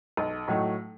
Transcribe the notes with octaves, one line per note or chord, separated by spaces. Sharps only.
B1
A2 F#3 A3 D#4